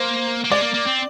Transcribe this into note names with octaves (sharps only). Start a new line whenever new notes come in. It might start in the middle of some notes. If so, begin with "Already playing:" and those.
Already playing: A#3 C5
A#3
G#3 D5
A#3
A#3
C4